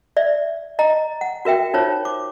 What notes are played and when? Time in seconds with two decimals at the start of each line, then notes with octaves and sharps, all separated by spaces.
0.17 D5 E5
0.79 D#5 A#5
1.21 F#5
1.45 F#4 A#4 E5 G5
1.74 D#4 F4 A#4 C5 C#5
2.05 D6